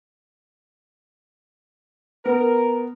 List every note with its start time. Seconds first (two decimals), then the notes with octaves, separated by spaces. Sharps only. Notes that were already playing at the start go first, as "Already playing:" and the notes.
2.25 B3 A#4